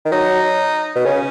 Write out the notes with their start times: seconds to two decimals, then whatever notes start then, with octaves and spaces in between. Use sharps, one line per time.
0.05 D#3
0.12 F#3 D#4
0.96 B2
1.05 C#3 C#4